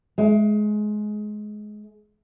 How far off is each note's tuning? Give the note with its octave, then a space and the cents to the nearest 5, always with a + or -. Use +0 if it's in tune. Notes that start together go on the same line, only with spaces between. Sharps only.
G#3 +20